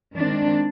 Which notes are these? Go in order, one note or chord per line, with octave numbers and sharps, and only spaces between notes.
D#3 G#3 C4 D4